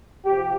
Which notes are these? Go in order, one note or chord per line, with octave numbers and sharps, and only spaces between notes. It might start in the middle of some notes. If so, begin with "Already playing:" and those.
C3 F3 G4